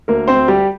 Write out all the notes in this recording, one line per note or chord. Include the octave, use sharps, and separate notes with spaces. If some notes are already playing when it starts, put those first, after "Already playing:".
D2 A#3 A#4
C4 C5
D2
G3 G4